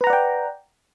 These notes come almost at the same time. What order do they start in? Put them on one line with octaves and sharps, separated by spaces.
B4 A#5 F#5 D5 G5